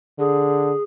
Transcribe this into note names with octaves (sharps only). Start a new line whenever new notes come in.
D3 G#4